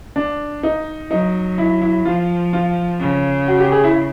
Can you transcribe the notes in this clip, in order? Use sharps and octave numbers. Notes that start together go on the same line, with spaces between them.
D4
D#4
F#3 D#4
E4
E4
F3 F4
F4
C#3
F#4
G4
G#4
E4